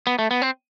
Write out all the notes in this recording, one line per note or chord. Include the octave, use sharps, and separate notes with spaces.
B3
A3
B3
C4